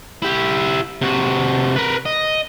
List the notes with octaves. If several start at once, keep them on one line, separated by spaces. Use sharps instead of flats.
E4 G4
C3 F#4
A#4 B4
D#5